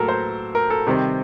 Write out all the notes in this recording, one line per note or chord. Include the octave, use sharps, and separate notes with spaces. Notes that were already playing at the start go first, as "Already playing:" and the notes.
Already playing: A2 F#3 A#3 A4 A#4
C5
A#4
A4
C3 D#3 G3 C4